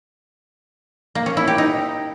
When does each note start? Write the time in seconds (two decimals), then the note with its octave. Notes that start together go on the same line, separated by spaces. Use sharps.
1.15 A#3
1.26 C#4
1.37 E4
1.48 G4
1.58 D#4